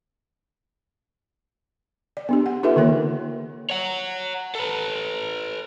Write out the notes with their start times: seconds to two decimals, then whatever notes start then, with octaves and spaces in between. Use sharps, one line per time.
2.17 D5
2.29 B3 D4 G4
2.46 F#5
2.63 D#4 F4 G4 A4 B4 E5
2.76 D3 D#3 A#3 A#4 C#5
3.70 C#5 F#5
4.55 A4 B4